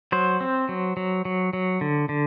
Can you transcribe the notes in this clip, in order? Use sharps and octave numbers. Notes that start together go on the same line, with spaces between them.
F#3 C5
C4
F#3
F#3
F#3
F#3
D3
D3